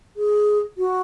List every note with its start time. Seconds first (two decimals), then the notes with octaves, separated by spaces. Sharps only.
0.17 G#4
0.78 F#4